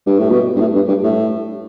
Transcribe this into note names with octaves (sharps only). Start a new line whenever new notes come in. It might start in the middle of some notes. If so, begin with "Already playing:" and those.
G2
A2
B2
G2
A2
G2
G2
A2